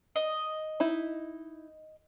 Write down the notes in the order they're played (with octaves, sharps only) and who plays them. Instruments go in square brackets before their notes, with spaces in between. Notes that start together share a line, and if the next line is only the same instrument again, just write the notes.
[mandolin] D#5
[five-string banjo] D#4 E4